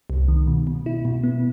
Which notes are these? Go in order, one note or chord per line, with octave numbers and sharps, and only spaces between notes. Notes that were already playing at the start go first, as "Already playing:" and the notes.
C2
D#3
B2
B2
E4
B2
B3